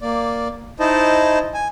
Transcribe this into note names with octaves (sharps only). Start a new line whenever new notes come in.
A#3 D5
D#4 E4 C5 D#5 A5
G#5